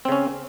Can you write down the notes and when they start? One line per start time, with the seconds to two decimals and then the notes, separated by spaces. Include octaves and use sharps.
0.05 C4
0.09 C#3
0.12 C#4